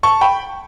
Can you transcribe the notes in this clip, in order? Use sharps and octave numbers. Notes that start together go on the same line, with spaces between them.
A5 C#6
G5 B5